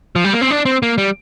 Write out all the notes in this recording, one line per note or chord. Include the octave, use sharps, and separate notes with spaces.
F3
G3
A#3
C4
D4
C4
A#3
G3